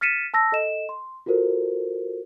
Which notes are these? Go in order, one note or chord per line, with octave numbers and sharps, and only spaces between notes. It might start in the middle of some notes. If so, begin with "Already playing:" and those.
F6 A6 B6 C#7 D#7 E7
A5 E6 A#6
A4 D#5 E7
C6
F4 F#4 A4 A#4 C5